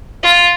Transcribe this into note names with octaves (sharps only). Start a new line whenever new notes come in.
F4